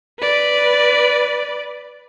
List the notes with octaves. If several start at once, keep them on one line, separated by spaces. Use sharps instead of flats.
B4 D5